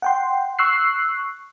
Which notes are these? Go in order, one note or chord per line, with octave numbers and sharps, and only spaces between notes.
F#5 G5 C6
C#6 E6 F#6 C7